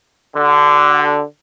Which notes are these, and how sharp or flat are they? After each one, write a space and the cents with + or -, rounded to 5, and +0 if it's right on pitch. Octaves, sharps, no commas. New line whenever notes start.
D3 +0 F#4 +35